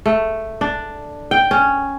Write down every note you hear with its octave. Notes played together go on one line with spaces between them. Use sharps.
A3
D4
G5
C#4